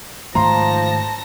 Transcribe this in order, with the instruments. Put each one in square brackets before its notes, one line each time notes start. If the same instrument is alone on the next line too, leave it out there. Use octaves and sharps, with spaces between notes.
[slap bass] G#2 D#3 A3 [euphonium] F3 [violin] A5 A#6 [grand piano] A#5 C6